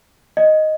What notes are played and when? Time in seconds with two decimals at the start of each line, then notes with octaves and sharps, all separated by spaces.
0.37 D#5